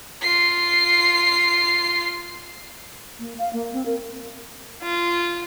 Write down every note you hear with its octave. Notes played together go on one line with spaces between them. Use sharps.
F4 C7
A#3
F5
A#3
C4
A#4
F4